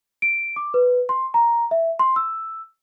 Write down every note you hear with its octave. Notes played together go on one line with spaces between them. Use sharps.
D7
D6
B4
C6
A#5
E5
C6
E6